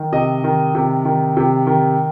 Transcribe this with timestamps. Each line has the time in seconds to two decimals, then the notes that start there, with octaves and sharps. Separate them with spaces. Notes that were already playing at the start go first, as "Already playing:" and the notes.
Already playing: D#3
0.12 C3 D#5
0.44 D#3
0.75 C3
1.05 D#3
1.37 C3
1.67 D#3